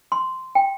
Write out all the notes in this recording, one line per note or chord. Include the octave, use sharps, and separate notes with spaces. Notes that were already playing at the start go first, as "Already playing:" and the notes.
C6
G5